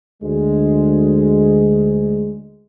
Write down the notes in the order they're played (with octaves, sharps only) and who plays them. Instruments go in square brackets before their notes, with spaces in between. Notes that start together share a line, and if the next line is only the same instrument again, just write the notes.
[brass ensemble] D2 G#3